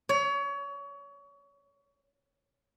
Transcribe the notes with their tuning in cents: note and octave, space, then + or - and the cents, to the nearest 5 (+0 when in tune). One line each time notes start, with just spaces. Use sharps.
C#5 +30